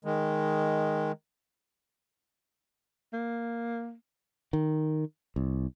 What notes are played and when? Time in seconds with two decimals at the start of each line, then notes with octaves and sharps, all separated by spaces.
0.05 D#3 G#3
3.13 A#3
4.53 D#3
5.36 C2